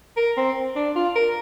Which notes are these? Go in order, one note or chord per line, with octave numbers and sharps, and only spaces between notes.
A#4
C4
D4
F4
A#4